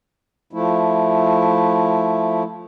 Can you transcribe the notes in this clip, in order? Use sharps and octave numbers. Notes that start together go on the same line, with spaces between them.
F3 A3 E4